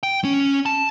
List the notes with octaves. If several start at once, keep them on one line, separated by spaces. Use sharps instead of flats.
G5
C#4
A5